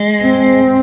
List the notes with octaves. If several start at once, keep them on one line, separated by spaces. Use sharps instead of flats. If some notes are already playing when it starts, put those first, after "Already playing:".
Already playing: G#3
C4